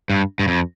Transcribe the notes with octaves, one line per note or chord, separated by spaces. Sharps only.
G2
G2
F2